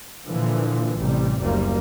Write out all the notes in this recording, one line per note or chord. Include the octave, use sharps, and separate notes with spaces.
A#2 D3 E3 F3
A1 C3 G3
F#1 D2 G3 A#3